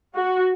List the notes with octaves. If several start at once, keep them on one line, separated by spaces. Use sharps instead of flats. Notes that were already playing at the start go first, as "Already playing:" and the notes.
F#4